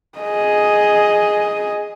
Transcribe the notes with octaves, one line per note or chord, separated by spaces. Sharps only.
G#4 D#5